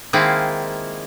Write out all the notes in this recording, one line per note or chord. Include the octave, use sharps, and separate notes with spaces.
D#3 G#3 A#3 C4 E4 F4